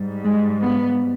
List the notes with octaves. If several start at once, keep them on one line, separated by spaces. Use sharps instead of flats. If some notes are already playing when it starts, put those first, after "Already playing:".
Already playing: G#2 G3
G#3
B3